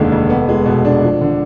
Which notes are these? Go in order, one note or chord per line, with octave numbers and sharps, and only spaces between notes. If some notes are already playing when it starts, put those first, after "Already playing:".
Already playing: F1 D#2 D3 G#3
F1
B3
G#3
B2
D4
F3
D3